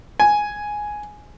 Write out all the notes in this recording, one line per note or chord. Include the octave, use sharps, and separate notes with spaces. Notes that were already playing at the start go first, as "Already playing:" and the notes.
G#5